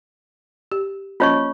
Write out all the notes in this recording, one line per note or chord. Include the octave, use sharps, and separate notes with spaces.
G4
A#3 C#4 F4 C#5 D#5 C#6